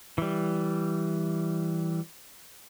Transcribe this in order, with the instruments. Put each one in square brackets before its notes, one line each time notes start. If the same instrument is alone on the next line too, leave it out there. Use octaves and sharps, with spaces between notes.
[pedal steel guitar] E3 G3